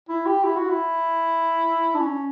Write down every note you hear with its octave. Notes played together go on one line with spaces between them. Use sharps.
E4
G4
E4
F#4
E4
D4
C#4